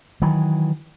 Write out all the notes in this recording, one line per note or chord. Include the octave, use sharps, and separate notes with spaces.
D#3 E3 F#3